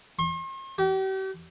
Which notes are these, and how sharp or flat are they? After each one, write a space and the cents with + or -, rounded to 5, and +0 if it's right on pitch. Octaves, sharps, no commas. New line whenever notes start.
C6 +45
G4 -40